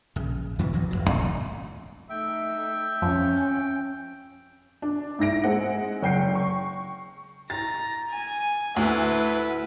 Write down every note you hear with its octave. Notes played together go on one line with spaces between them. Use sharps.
A#1 C#3
D#2 D#3 E3 B3
F#1 E2 G2 F3
D1 C#2 F#3
A#1 G2
A3 D#4 E5 G5
F2 C#4
D4
G#2 E4 A#6 D7
G#3 C4 F#5
F#1 G5 C7 C#7
C#6
A#5 A6
G#5
D2 E4 B4